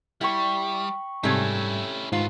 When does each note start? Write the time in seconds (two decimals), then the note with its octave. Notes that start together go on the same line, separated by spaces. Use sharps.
0.21 G3 E4 G5 B5 C#6
1.23 G#2 C3 G3 A3 C#4 E4 G#5 G#6
2.13 G#2 D#3 B3 F4